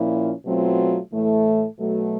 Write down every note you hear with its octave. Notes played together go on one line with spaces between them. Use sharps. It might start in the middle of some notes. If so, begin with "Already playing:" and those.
Already playing: A#2 F3 A#3 C#4 E4
B2 F#3 A3 C4 F4
A2 E3 A3
B2 F#3 A3